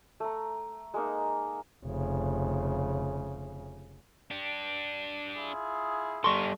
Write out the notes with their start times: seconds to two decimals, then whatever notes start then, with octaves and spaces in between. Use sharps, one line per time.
0.20 A3 A#5
0.94 G#3 A#3 D#4
1.86 F1 C#3
4.31 D4 G4
5.36 E4 F4 G#4
6.24 G3 D#4 A4 A#4 C6 C#6